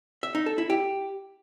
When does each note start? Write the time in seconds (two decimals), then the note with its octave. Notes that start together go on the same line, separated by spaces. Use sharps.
0.23 E5
0.35 D#4
0.46 A4
0.58 E4
0.70 G4